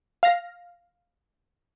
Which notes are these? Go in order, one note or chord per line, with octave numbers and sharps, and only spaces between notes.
F5 F6 A#6